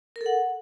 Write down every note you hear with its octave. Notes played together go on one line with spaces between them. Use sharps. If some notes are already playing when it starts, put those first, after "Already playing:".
A#4
A4
F#5